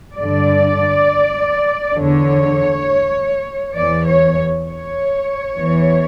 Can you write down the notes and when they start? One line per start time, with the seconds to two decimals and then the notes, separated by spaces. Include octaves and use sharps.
0.17 G2 D3 D5
1.97 E2 D3 C#5
3.77 E2 E3 D5
4.07 C#5
4.67 C#5
5.57 E2 E3